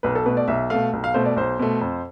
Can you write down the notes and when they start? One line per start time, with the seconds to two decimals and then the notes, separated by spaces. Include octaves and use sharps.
0.03 B1 B4
0.15 A4
0.26 B2 A3 B4
0.37 D5
0.48 B1 E5
0.70 B2 A3 F5
0.93 B1
1.04 F5
1.14 B2 A3 C5
1.26 D5
1.36 B1 C5
1.59 B2 A3
1.81 F2